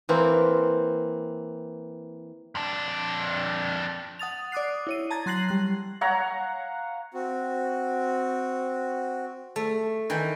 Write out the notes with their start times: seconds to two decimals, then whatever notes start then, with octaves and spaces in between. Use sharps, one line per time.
0.09 E3 A#3 C4
2.55 F2 D4
4.19 F#5 D#6 A6 F7
4.52 D5 D6 D#6 F#6 C7
4.87 E4 C#5 D#7
5.10 A5 A#5 G#6 A6
5.26 F#3 C6 F#6 A#6 C7 F#7
5.49 G3 F#6
6.01 C#5 F5 F#5 A#5
7.14 C4 F#4
9.56 A3
10.10 D#3 E3 G5